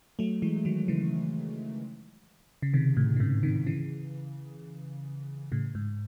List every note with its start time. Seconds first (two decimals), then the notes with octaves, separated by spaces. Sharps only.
0.19 F#3 A3
0.42 E3 G#3
0.65 D#3 F#3
0.88 C#3 E3
2.62 C#3
2.74 C3 D#3
2.97 A2
3.16 C#3
3.20 G#2 C3
3.43 C3 D#3
3.66 C#3 E3
5.52 A2 C#3
5.75 G#2